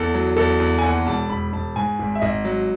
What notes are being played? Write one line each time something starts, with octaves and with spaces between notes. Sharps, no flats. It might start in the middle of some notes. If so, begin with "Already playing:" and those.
Already playing: E2 A4
F#3
E2 A4
E2
G#5
D#2 F#5
E1 A5
E1 B5
E1 A5
G#2 G#5
G#1
E5
G#1 D#5
F#3